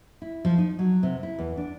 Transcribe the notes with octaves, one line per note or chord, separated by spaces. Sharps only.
E4
F3
D#4
F#3
C3
E4
E2
D4